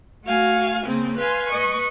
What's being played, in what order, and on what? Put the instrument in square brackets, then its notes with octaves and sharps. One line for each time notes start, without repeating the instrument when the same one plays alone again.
[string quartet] A3 F#4 F5 G#5
C#3 A#3 C4
B4 F5 G#5 C6
B4 D#5 C#6